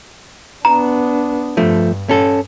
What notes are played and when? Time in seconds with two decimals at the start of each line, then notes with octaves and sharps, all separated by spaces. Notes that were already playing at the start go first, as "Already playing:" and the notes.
0.65 B3 D4 A#5
1.57 G2 F3 A3
2.09 C#4 A4